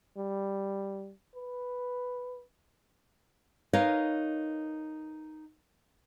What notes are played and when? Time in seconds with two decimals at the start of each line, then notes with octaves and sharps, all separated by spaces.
0.17 G3
1.35 B4
3.73 D#4 A#4 B4 C#5 D#5 F5